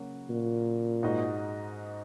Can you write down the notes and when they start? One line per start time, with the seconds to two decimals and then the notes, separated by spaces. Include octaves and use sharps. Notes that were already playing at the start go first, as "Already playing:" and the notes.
Already playing: C#3 F#3 A#3 F#4
0.30 A#2
1.02 G#2 G#3 D#4 F#4 D#5